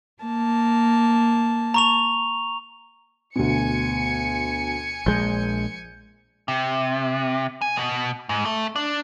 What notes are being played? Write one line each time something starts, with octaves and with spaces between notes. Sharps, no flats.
A#3 A5
A#5 C#6 F7
D2 B2 G#5 C#7
A#1 G#3 G6
C3
G#5
B2
G#2
A3
D4